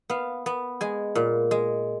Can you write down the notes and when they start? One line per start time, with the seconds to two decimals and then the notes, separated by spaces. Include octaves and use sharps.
0.10 B3 F5
0.46 B3
0.81 G#3 G#5
1.15 A#2
1.51 G#3